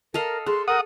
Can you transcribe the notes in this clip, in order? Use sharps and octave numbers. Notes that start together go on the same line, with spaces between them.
A4 A#4 D#5 F5
G#4 A4 C6
A#4 F#5 D#6